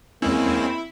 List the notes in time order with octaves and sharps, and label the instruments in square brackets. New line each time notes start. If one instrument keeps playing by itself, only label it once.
[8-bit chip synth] E2 G#3 C#4 [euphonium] A#3 [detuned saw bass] C4 [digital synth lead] E4